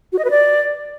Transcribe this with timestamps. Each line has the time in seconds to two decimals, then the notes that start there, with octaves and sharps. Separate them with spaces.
0.13 F#4
0.19 D#5
0.24 B4
0.30 D5